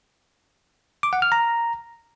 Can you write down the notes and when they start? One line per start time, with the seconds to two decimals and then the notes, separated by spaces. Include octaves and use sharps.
1.03 D6
1.13 F#5
1.22 F6
1.32 A#5